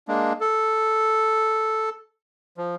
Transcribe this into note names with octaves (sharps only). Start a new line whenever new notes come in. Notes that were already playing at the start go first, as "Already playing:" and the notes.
G#3 A#3 D4
A4
F3